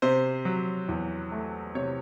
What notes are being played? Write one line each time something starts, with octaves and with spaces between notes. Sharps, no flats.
C3 C5
F#3
E2
A3
C3 C#5